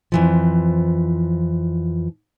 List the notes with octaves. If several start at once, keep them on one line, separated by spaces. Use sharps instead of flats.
F2 E3 F3